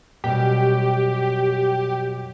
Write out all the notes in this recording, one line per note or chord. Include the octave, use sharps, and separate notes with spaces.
F#2 B2 G3 G4